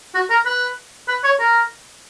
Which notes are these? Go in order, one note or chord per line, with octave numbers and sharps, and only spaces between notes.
F#4
A#4
B4
B4
C#5
A#4